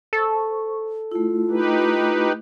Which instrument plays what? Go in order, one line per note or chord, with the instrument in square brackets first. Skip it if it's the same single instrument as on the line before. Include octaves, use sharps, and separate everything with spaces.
[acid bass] A4 [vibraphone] C5 C#6
[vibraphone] A3 E4 [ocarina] F4
[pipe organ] D#4 G4 B4